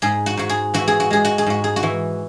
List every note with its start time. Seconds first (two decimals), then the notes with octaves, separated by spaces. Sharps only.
0.02 G#2 G#4
0.26 F#4
0.37 G#2 F#4
0.49 G#4
0.74 E3 F#4
0.87 G#4
1.00 F#4
1.10 G#3 G#4
1.25 F#4
1.38 G#4
1.46 G#2 F#4
1.64 G#4
1.76 F#4
1.83 E3